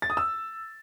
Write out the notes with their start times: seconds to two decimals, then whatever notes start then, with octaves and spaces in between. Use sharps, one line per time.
0.02 A6
0.10 D#6
0.17 E6